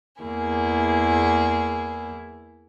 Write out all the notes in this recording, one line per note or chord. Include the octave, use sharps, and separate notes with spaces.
E2 A#3 E4 G#4